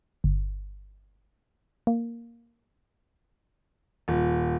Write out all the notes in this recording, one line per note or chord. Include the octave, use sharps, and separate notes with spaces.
G1
A#3
D#1